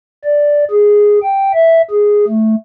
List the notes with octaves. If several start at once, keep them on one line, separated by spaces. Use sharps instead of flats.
D5
G#4
G5
E5
G#4
A3